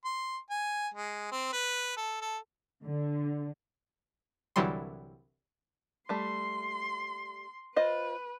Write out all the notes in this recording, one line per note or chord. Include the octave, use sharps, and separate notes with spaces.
C6
G#5
G#3
C4
B4
A4
A4
D3
C2 D3 E3 F#3 G3 C6
G3 A3 C6
F4 B4 C5 D#5